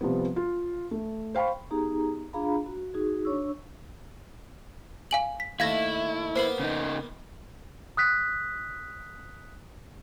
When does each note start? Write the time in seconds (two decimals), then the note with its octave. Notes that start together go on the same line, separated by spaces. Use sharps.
0.01 C3 F3 G3 B3
0.36 F4
0.91 A3
1.35 C5 F5 G5 B5 C#6
1.71 B3 D#4 G4 G#4 A#5
2.33 D4 F4 G#4 F5 A#5 B5
2.66 F#4
2.94 D#4 F#4 G#4
3.25 D4 C#5 C#6 E6
5.11 F5 G#5 F#7
5.40 B6
5.60 D#2 A3 E4 F5 G#6 A#6
6.36 A#3 B3 C5 C7 F#7
6.60 C#3 D#4
7.97 D#6 F#6 B6